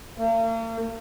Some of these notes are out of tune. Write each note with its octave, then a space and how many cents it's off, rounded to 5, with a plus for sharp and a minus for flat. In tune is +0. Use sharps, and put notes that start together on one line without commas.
A#3 -45